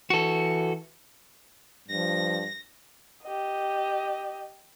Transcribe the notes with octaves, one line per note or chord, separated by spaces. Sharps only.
E3 F#4 A4
G2 F3 A#6
G4 D#5